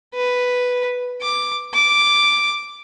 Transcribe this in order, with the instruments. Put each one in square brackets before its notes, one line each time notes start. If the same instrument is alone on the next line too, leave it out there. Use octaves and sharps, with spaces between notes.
[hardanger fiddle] B4
D6
D6